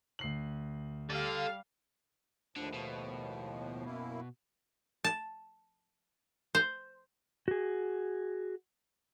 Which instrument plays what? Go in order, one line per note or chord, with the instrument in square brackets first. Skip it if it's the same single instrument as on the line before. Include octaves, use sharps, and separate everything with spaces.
[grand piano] D2 C7 F#7
[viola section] G3 F5 [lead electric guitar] A4 D5
[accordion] D#2 A2 F3 [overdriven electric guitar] D3
[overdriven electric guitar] B2
[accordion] F#2 A#3 E4
[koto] A5
C5
[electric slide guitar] F#4 G#4